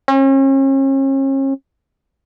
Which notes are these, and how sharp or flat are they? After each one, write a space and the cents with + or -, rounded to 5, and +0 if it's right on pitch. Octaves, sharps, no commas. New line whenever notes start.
C#4 -40